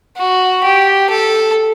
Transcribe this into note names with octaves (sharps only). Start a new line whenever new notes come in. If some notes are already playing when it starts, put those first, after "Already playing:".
F#4
G4
A4